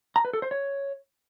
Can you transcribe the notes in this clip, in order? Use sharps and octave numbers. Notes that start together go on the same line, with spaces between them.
A#5
B4
A4
C5
C#5